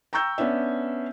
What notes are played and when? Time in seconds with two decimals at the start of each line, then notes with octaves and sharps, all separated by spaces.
0.13 G5 A#5 C#6 E6 G6
0.38 B3 C#4 D4 E5